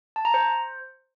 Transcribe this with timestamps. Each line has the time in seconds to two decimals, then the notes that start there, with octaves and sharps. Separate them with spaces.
0.16 A5
0.25 A#5
0.34 C5